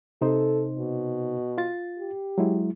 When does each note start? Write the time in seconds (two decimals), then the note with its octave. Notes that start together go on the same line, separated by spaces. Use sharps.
0.22 C3 D#4 A4 C5
0.78 B2
1.58 F4 A6
1.99 G4
2.38 F#3 G#3 E4